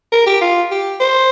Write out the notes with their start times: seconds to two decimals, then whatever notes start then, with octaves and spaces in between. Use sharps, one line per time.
0.12 A#4
0.27 G4
0.41 F4
0.71 G4
1.00 C5